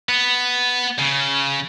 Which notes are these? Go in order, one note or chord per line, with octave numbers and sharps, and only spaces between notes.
B3
C#3